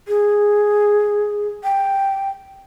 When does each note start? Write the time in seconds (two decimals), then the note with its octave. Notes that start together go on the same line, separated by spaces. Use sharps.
0.08 G#4
1.64 G5